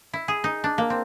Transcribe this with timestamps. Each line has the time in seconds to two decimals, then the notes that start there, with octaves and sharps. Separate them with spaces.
0.13 E4
0.28 G#4
0.44 D#4
0.64 D4
0.78 A#3
0.90 C4